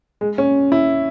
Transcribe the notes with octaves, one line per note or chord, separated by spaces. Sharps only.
G#3
C#4
E4